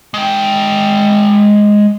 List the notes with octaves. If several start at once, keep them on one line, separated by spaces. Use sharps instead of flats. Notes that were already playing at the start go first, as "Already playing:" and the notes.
G#3 G5